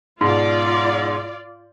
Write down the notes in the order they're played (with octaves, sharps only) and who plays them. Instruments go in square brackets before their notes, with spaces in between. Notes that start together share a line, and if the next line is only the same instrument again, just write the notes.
[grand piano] G#2 B2 [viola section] F4 D5